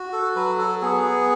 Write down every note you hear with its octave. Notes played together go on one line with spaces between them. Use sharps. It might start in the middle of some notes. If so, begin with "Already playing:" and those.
Already playing: F#4
A4
F#3 B4
A4
B3 G#4